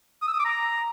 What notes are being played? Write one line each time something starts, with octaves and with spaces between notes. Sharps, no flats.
D#6
E6
D#6
D6
A#5